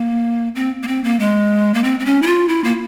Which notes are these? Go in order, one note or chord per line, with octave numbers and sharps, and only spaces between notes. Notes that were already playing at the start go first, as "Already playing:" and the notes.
Already playing: A#3
C4
A#3
C4
A#3
G#3
A#3
C4
C4
C#4
E4
F4
E4
A#3